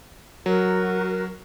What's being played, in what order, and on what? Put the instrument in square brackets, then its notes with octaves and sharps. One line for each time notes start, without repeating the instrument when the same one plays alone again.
[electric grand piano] F#3 [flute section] F#4 A#4